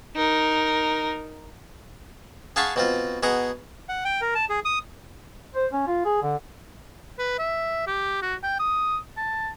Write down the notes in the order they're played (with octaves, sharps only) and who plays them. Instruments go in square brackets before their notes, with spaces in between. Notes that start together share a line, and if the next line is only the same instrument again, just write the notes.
[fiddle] D#4 A#4
[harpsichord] G#4 F5 F#5 A5 B5 C#6
B2 C4 F4
B2 G#4 F#5 A#5
[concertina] F#5
G5
A#4
A5
G#4
D#6
[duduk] C5
C#4
F4
G#4
D3
[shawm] B4
E5
G4
F#4
G5
D#6
A5